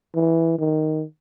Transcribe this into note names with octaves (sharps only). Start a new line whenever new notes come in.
E3
D#3